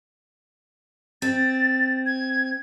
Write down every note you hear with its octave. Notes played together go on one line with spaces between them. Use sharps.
C4 A6
G#6